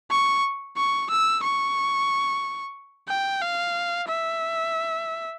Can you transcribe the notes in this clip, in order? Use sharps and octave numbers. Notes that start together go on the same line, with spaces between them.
C#6
C#6
E6
C#6
G5
F5
E5